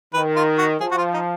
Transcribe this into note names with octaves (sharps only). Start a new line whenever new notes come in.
D#3 B4
F4
F#4
F3 G#4
F#4
F4
D#4